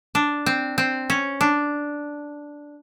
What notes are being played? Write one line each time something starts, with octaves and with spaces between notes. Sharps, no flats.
D4
C4
C4
C#4
D4